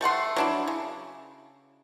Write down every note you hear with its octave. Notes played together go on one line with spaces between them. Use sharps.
G3 A3 F#5 C6
F#3 D4 E4
C#3